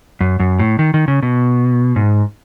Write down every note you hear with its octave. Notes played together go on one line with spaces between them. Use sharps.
F#2
F#2
A2
D#3
D#3
C#3
B2
G#2